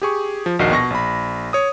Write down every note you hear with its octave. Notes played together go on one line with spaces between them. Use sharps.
G4 G#4 C#6
F3
A#1 D#2 F#4 A#4 D#5 C7
B2 C#6 A#6
A#1 B5
C#5 D#6